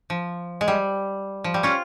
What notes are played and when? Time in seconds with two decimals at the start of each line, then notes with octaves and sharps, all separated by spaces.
0.10 F3
0.61 G#3
0.68 G3
1.44 F3
1.54 G3
1.63 C#4 F4